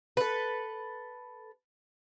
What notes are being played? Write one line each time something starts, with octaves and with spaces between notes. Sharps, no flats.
A4 B4